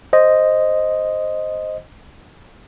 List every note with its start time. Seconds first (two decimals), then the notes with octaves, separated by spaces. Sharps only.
0.13 C5 D#5